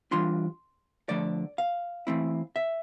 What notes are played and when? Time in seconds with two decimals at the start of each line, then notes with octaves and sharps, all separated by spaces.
0.11 E3 G3 D4 F4 C6
1.09 D3 F3 A3 D5
1.58 F5
2.07 E3 A3 C4 E4
2.56 E5